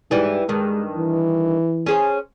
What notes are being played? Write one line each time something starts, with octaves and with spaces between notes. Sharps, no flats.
G#2 E3 G3
G2 D#3 G#3
E3
C#4 G#4 C5